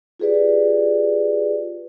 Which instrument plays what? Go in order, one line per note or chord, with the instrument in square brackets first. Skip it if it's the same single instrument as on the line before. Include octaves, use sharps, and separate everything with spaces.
[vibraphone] F4 G4 G#4 B4 D5